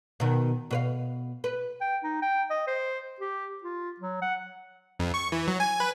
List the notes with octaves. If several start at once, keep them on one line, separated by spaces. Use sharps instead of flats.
B2 D#3
B2 B4 F5
B4
G5
D#4
G5
D#5
C5
G4
F4
F#3
F#5
F2
C#6
E3
F#3
G#5
B4